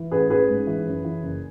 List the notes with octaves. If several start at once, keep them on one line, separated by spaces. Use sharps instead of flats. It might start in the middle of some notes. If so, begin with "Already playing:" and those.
Already playing: E3
A1 G#4 B4
A1 G#4 B4
G#2
E3
F#2
E3
F#1